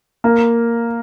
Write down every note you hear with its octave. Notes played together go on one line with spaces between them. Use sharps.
A#3